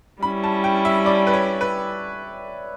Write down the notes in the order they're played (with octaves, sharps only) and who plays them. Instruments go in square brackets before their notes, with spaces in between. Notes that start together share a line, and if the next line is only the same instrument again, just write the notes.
[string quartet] G3 C#4 E4 [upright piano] B5
[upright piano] A5
G5
E5
D5
B4
C#5
B4